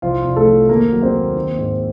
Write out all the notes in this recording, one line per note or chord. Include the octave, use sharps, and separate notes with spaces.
C2 F3 F4
C2
A3 A4
F3
D#2 A#3 A#4
F#3
C4 C5
D#2
D#3
G#2